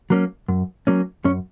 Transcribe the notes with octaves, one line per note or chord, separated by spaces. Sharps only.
F#3 A#3 C#4
F#2
F#3 A#3 C#4
F#2 C#4 C#5